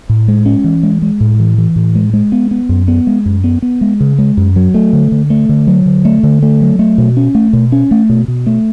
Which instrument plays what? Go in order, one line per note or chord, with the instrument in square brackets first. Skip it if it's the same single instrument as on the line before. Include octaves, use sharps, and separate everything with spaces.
[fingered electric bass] A2
G#3
C#4
E3
G#3
G#3
A2
E3
E3
A2
G#3
G#3
B3
B3
F#2
B3
G#3
F#2
B3
B3
G#3
C#3
G#3
F#2
F#3
A3
D3
D3
A3
D3
F#3
D3
A3
D3
A3
F#3
A3
B2
C#4
A3
B2
C#4
A3
B2
B2
A3